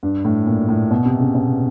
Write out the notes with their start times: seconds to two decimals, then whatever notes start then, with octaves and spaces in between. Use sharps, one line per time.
0.03 G2
0.25 A2
0.47 A#2
0.69 A2
0.91 B2
1.05 C3
1.20 C#3
1.35 B2